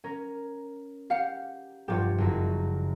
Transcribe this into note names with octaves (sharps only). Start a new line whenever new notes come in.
C#4 A#4
G4 F5 F#5
F1 G2 F4 G4 C#5
F#1 F#2 C#3